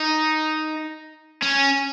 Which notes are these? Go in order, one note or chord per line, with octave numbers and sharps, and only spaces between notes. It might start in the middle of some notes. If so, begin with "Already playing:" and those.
Already playing: D#4
C#4